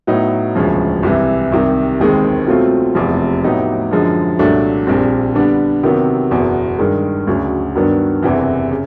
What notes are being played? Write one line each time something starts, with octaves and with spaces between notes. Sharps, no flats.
A2 F#3 B3 D#4
E1 D2 C#3 F3
C2 C3 E3
C2 C3 D#3
E1 D#2 D#3 G#3 C4
B2 F#3 A3 C4 F4
F1 E2 C3 F3
A2 F#3 B3 D#4 G4
F#2 D3 F3 G#3
C2 A#2 F#3 A3 D4
A#1 A#2 G3 C4
D3 G3 B3 D4
C3 D#3 F#3 B3
F#1 E2 B2
G2 D#3 G#3
D2 C#3 F#3
G2 D#3 F#3 B3 D4
F#1 E2 C3 E3
C#3